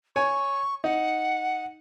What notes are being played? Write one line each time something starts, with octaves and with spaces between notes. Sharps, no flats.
C#5 G#5 C#6
D#4 F#5